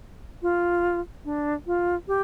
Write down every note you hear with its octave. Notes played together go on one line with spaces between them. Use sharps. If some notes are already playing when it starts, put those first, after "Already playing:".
F4
D4
F4
G4